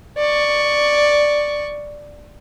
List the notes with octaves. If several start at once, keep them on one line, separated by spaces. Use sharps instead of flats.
D5 C#6